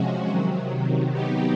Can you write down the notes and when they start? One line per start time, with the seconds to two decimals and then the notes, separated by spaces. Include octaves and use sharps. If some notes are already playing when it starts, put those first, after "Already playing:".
Already playing: C3 F3 G#3 C#4 F#4
0.26 C3 D#3 F#3
1.10 F#3 B3 D#4 G4